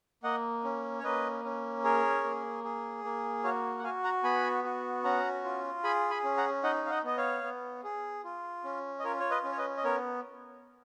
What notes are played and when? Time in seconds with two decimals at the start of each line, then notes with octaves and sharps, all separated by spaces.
0.23 A#3 D#5 F#5
0.64 C#4
0.99 C#5
1.03 A#3 B4 D#5
1.44 C#4
1.84 G#4 A#4 C#5
2.24 A#3
2.64 G#4
3.04 A#3
3.44 F#4 C#5 F5
3.79 F#5
3.84 F#4 F5 G#5
4.04 F#5 A#5
4.23 B3 G#5 B5
4.64 F#4
5.04 C#4 F#5 A#5
5.44 F4
5.84 G#4 G#5 B5
6.10 G#5 B5
6.23 C#4
6.37 F#5 A#5
6.63 D#4 D#5 F#5
6.86 F5
6.90 D#5 F#5
7.04 B3 D#5
7.17 C#5 F5
7.43 B3
7.84 G#4
8.24 F4
8.64 C#4
8.99 D#5
9.04 F4 A#4 C#5
9.20 C#5
9.30 B4 D#5
9.44 C#4
9.52 C#5
9.57 B4 D#5
9.77 D#5
9.84 B3 A#4 C#5